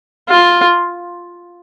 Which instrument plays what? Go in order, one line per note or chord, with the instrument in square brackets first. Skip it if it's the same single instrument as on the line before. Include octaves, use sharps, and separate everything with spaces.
[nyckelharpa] F4